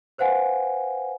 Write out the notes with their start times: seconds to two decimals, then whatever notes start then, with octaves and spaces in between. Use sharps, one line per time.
0.18 B4 C5 F5 F#5 G#5